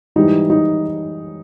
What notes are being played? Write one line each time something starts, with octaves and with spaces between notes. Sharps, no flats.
G#2 E3 G3 D#4
D#4